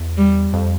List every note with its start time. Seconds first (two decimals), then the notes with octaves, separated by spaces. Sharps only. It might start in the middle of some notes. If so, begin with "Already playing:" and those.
Already playing: E2
0.18 G3
0.53 F2